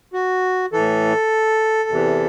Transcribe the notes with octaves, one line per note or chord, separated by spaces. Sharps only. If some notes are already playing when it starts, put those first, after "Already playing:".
F#4
A2 E3 A4
E2 C3 E3